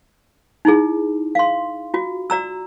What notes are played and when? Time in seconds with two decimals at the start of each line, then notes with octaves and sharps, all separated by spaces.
0.65 D#4 E4 G#4
1.35 F5 C6
1.94 F4 F#4
2.30 F#4 D5 A#5 E6